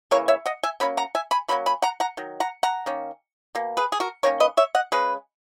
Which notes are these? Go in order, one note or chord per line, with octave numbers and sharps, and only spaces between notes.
C#3 E3 A#3 A#4 C#5
C#5 E5
D#5 F#5
E5 G#5
C#3 F#3 A#3 C#4 B5
F#5 A#5
E5 G#5
G#5 B5
B2 F#3 A#3 C#4 B5
G#5 B5
F#5 A#5
F#5 A#5
D#3 F#3
F#5 A#5
F#5 A#5
D#3 A#3 C#4
B2 A#3
G#4 B4
G#4
F#4 A#4
D#3 A#3 C#4 A#4 C#5
B4 D#5
C#5 E5
D#5 F#5
C#3 G#3 C#4 G#4 B4